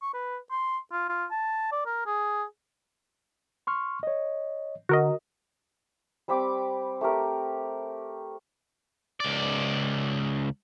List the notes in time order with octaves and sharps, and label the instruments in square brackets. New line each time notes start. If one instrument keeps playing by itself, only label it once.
[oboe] C#6
B4
C6
F4
F4
A5
D5
A#4
G#4
[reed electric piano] C6 C#6 F6
C#5 D#5
[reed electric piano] D3 [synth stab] F#4 A#4 D#5
[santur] G3 C4 B5 D6
A3 G4 A#4
[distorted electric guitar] C#2 D5